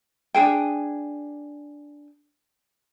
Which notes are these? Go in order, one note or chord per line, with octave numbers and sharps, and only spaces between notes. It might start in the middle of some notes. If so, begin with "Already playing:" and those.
D4 F#4 G#4 G5